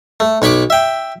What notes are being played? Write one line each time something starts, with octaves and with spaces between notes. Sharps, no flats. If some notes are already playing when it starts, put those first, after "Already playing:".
A3
B1 C#5 B5 C#6 D6
E5 G5